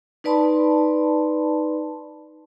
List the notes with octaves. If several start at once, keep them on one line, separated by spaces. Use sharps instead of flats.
D#4 B4 D5 A5 B5 C6